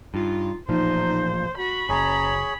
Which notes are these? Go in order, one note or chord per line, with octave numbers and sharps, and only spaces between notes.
G2 D#4 F4
A1 A#2 F3 D#4 C5
F#4 B5
F#1 C#4 G#4 C#5 A5 A#5